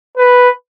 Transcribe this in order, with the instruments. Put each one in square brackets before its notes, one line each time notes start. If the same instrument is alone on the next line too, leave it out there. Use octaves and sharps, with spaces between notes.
[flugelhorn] B4